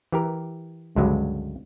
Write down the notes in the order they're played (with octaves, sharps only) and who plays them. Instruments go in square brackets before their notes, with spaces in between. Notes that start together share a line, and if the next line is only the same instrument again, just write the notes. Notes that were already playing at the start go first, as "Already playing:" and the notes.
[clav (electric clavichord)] E3 G4 A#4
C#2 G2 D3 F#3 G#3